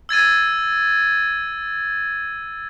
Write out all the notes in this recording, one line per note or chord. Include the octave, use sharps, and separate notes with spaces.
E6 G#6 A6 D#7